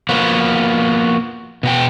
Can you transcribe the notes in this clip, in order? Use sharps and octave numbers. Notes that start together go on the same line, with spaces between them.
F3 A#3 B3 F#4
B2 F#4 G5